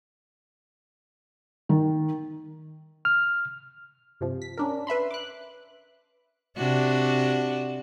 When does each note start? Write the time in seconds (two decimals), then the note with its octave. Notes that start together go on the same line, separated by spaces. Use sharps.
1.69 D#3
3.05 F6
4.21 G2 C3 F3
4.42 B6
4.58 C#4 D4 A#4
4.87 B4 E5 B5 C6
5.11 D6 F#6
6.57 C3 D4 F#4